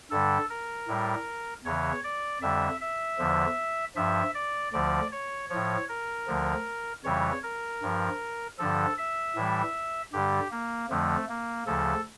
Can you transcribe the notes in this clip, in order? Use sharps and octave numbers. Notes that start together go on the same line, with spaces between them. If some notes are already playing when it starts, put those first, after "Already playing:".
G2 D3 G3 A4
A#4
A2 G3
E2 C#3 E3 C#5
D5
F2 D3 G3 E5
E5
E2 D3 F3
G2 F3 E5
D5
D2 D3 F3 D5
C#5
A2 F3 C#5
A#4
D2 D3 F3
F2 C#3 E3 G3 C#5
A#4
G2 F3
G2 D3 F3 A4
E5
A2 E3 G3
G2 D3 G3 G4
A#3
F2 D3 F3 A3
A#3
D2 C#3 F3 A4